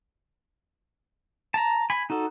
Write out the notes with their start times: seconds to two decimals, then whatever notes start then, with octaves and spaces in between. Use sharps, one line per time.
1.54 A5 A#5
1.90 G#5 B5
2.10 D#4 F#4 A4